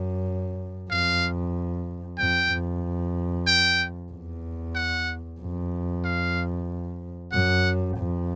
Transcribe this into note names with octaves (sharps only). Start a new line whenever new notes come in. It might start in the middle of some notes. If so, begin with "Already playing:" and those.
Already playing: F#2
F2 F5
F2 G5
F2
G5
E2
F#5
F2
F5
F#2 F#5
F2